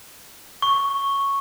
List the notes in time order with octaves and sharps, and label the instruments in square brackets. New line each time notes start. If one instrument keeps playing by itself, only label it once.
[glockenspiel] C#6